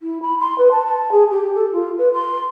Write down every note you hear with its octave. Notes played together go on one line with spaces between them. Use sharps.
E4
B5
C6
B4
A5
A5
G#4
G4
A4
F4
B4
C6